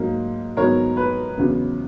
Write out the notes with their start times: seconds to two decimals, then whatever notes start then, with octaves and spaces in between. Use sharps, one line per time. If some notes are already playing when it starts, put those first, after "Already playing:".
Already playing: G#2 F#3 A#3
0.57 G#2 D#3 F#3 B3 A#4 C#5
0.97 B4
1.37 E2 C#3 F#3 B3